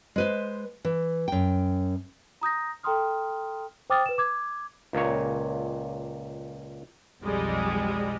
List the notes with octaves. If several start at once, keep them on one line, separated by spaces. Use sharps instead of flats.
G#3 B4 C5
E3
F#2 G5
A#5 D#6 G6 A#6
A4 G5 A#5 C6 D#6 F6
C5 G5 D6 D#6 F6 A6
B4 E7
D6 G#6
C#2 A#2 C#5
B1 F2 G3 G#3